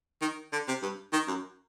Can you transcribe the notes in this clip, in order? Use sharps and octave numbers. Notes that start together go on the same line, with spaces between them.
D#3
D3
C3
G2
D#3
F#2